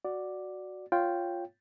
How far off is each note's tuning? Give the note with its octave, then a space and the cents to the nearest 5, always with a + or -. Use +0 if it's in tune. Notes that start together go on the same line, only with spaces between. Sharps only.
F#4 +0 D5 +0
F4 +0 C#5 -5 G5 +0